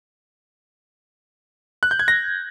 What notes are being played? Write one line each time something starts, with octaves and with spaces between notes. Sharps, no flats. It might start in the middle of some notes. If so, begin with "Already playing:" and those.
F#6
G6
G#6
A#6